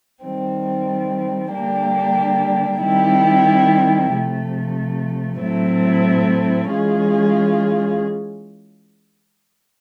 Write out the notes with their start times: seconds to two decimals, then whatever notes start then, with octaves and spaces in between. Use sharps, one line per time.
0.23 D#3 G3 C4
1.52 D3 G3 A#3 D4 G4
2.81 D#3 G3 C4 E4 G4
4.11 C3 F3 A3
5.40 A2 F#3 A3 C4 E4
6.69 E3 G#3 C#4 F4 G#4